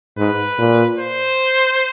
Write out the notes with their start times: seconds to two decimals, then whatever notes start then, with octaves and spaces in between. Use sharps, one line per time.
0.18 G#2 B4
0.58 A#2
0.98 C5